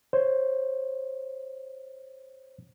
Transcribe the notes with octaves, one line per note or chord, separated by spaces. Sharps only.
C5 C#5